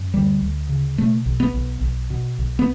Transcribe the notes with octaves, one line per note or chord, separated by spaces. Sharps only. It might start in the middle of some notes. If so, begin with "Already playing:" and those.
Already playing: F#2
D2 G3
D2
C#3
B2 A3
B1
B3
B1
B1
B2
B1
B3